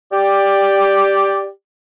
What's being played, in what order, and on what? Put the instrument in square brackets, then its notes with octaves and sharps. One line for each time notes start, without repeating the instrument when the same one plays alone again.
[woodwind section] G4 D5